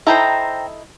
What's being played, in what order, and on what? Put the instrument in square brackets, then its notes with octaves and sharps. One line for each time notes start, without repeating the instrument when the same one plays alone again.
[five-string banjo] D#4 E4 A4 [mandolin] C5 G5 A#5